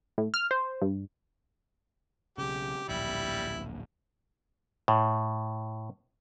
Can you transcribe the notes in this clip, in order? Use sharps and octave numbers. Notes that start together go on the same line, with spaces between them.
A2
F6
C5
G2
B1 C#3 G4
D1 A#1 G3 E4
A2